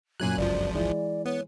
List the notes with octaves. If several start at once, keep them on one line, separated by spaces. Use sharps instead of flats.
F#2 A#2 F#3 G#5 F#6
G1 C#2 F3 D5
E3 G#3 D5
B3 C#5